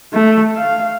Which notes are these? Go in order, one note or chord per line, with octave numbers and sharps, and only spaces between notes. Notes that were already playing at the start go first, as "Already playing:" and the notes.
A3
F5